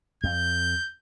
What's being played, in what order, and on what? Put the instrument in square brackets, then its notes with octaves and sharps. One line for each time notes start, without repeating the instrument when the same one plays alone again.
[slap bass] F2 [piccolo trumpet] G6